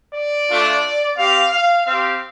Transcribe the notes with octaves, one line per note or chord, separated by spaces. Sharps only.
D5
A3 D4 F4
C4 G4 F5
F5
C4 G4 F5